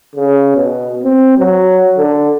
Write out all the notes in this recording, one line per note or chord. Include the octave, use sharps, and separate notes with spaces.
C#3
B2
C4
F#3
D3